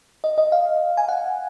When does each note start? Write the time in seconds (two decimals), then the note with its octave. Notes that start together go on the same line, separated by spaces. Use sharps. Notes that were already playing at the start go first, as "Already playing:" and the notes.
0.24 D#5
0.38 D#5
0.52 F5
0.97 G#5
1.08 F#5